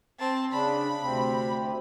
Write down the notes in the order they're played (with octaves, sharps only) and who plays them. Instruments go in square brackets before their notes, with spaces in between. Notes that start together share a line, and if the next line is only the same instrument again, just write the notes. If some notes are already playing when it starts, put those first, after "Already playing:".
[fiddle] C4 A5
[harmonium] C#3 D4 [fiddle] B5
[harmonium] D2 C3 C4